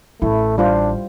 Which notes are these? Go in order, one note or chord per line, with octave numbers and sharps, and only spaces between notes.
A1 A3 E4
G3 D4 F4 C5